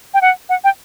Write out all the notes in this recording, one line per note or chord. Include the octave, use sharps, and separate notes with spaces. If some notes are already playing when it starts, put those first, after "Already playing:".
G5
F#5
F#5
G5